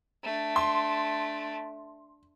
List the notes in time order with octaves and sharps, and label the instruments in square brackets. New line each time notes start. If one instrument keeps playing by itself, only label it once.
[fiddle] A3 D4
[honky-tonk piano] C6